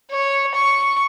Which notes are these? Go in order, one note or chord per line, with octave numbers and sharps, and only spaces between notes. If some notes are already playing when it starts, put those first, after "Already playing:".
C#5
C#6